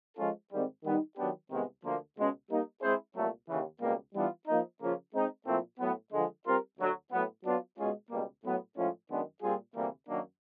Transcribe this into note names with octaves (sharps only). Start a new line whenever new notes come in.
F3 G#3 C#4 F4 A4
G#2 D#3 G3 C4
D#3 G3 B3 D#4
D#3 F#3 B3 D4 G4
C2 C3 D#3 G#3 B3
D2 D3 F3 A#3
C#2 B2 G#3 C#4
G3 A#3 D#4
G#3 C4 E4 G#4 C5
C2 A#2 F#3 A3
D#2 C#3 E3
C#2 B2 G3 A#3
E3 G3 B3 D4 F4
F3 A#3 D#4
C#3 F3 A#3 C#4 F4
G#3 C4 D#4
A#2 F3 A3 C4 E4
A2 F#3 B3
D3 F3 G#3
G3 C4 F4 A#4
D2 D3 F#3
A2 F#3 B3
F#3 B3 D4 F4
B2 G#3 C#4 F4 G#4
C#2 B2 G3 A#3
A2 F#3 B3
A2 F3 G#3 C#4 F4
F#2 D#3 G#3 B3 D4
A#2 G3 C4 F4 G#4
D2 C3 E3 G3 A#3
F#2 D#3 F#3 A#3 D4